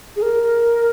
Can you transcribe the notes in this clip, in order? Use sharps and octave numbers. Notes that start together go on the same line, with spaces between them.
G#4
A#4